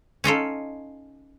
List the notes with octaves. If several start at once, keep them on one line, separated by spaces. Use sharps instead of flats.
C#4 D#4 F4 A4